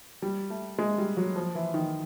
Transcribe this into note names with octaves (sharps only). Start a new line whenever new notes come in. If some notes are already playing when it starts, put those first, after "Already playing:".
G3
A3
G#3
G3
F#3
F3
E3
D#3